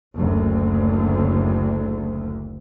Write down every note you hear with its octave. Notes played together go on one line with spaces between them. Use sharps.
F#1 D2